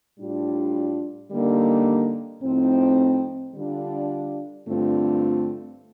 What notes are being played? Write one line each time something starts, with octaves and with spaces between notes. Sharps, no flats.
A2 G3 D4 F4
D3 G3 A#3 D#4
A2 F3 C4 D#4
D3 G3 D4 F4
G2 D3 A3 C4 F4